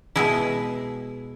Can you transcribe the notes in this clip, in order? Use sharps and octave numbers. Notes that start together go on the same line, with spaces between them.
B2 G#3 E4 G#4